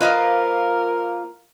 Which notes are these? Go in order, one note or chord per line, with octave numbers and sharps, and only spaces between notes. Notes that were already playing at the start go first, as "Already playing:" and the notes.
F3 A#3 F4 A#4 B4 D#5 F5